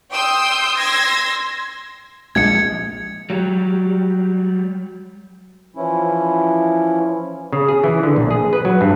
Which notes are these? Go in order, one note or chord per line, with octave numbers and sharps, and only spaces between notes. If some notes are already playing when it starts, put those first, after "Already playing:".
G5 C6 D#6 E6 G6 C7
C6 E6 G#6 A#6 C7
A#1 G#3 G#6 C#7
F#3 G3
E3 F3 C#4 E4
C#3
G#4
E3
D3
A#1
G#4
B4
F#3
G2